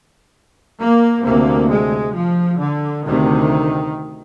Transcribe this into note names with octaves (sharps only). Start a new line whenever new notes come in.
A#3
D2 C3 A#3
G#3
F3
D3
D2 C3 D#3